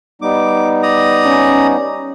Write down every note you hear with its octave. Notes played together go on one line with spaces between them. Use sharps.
G3 B3 D#4 D6
D5 A#5 D#6
C#4